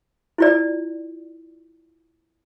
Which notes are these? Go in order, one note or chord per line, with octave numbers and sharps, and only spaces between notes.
E4 F4 D5